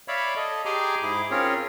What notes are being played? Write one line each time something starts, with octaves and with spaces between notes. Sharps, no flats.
C#5 D5 E5 F5 B5
A4 D#5
G4 G#4 G#5 A#5 C6 D6
G#2 E4 G#4 D6
C4 C#4 F4 G#4 A#4 C#5